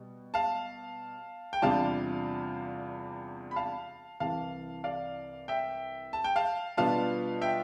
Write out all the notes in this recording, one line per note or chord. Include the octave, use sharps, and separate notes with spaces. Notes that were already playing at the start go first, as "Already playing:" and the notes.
Already playing: B2 G3
F5 A5
G5
E2 C3 G3 D4 F4 F5 A5
B5
F5 A5
C2 C3 E3 F5 A5
D5 F5
E5 G5
A5
G5
F5 A5
B2 G3 B3 D4 F4 F5 A5
E5 G5